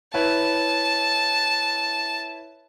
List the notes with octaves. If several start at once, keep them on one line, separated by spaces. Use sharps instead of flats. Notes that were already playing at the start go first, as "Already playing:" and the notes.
E4 B4 C#5 A5